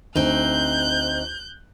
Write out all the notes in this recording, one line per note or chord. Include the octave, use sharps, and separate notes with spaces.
D2 C4 D#4 F#6 G6